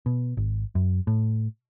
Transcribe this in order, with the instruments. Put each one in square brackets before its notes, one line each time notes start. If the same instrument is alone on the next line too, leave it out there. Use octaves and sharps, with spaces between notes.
[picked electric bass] B2
G#1
F#2
A2